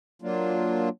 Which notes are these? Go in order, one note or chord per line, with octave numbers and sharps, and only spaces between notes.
F#3 A#3 D4 F4